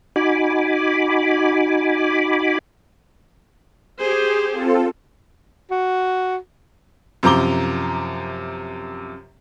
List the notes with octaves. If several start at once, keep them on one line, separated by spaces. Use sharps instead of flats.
D#4 F#4 G#5 B5 D6
G4 G#4 C5
C4 F4 A4
F#4
F#2 C3 F3 A#5 D6 G7